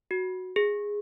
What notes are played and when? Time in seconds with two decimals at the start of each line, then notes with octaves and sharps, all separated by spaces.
0.11 F#4
0.56 G#4